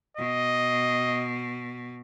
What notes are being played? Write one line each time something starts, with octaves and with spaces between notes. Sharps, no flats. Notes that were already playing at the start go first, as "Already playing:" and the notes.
B2 D#5